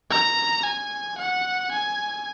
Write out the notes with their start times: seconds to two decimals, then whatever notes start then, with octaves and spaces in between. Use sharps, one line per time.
0.10 A#5
0.64 G#5
1.18 F#5
1.72 G#5